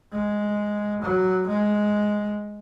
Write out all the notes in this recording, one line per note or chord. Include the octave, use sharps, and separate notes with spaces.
G#3
F#3
G#3